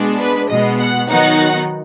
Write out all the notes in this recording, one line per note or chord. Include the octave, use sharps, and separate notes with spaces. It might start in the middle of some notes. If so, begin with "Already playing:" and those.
Already playing: B2 G#3 B3 D4
B4
B2 G#3 B3 D#5
F#5
D#3 F#3 B3 D#4 F#5